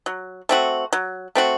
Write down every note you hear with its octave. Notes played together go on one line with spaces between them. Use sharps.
F#3
A3 C4 F#4
F#3
A3 C4 F#4